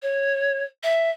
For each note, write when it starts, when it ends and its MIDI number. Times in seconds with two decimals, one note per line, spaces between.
0.02 0.62 73
0.83 1.10 76